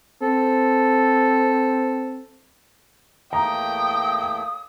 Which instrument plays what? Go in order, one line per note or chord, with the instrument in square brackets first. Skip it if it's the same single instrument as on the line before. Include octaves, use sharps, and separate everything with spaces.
[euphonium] C4 [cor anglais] A4
[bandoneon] E2 A3 A#3 [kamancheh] G5 [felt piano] A#5 [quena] D#6